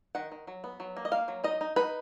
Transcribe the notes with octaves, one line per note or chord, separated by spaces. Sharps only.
D#3 F#5
D#3
F#3
B3
F#3
A#3
D#5
A#3 F5
F#3
D#4 D#5
D#4
D#4 B4